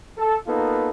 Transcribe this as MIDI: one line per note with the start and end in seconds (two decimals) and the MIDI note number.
0.18 0.37 69
0.47 0.89 58
0.47 0.89 59
0.47 0.89 63
0.47 0.89 65
0.47 0.89 69
0.47 0.89 71